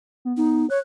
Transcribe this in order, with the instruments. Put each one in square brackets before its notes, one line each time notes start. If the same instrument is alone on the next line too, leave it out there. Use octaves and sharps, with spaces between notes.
[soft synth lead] B3
[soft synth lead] B3 [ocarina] D#4
[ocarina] C#5 [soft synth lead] F#6